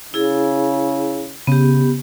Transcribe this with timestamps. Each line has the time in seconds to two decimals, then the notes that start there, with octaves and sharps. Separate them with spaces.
0.14 C#3 E4 G#4
1.47 C#3 B3 G4